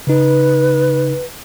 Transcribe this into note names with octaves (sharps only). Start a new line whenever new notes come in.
C#3 D#4 B4